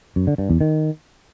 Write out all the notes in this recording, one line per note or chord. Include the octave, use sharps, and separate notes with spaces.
F#2
D3
G2
E2
D#3